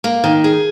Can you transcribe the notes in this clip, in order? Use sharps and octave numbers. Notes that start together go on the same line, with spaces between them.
A#3
D#3
G#4